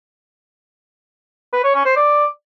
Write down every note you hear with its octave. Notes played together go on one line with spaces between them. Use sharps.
B4
C#5
C#4
C5
D5